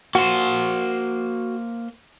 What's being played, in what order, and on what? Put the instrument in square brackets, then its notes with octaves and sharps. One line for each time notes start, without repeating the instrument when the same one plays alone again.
[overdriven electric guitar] A#3 C5 [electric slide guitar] F#4 F#5